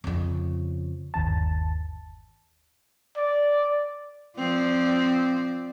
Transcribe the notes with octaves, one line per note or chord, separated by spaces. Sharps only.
F2 C#3
G1 D#2 A5
D5
F3 C4 D5